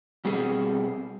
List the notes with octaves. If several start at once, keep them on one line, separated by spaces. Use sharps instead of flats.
B2 G3 C4 G#4